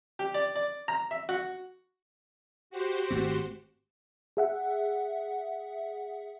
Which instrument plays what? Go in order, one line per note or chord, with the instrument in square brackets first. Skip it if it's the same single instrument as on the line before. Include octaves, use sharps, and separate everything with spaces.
[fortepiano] G4
D5
D5
A#5
E5
F#4
[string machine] F#4 G4 C5
[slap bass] G#1 A3 C4
[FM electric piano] G#4 E5 F#5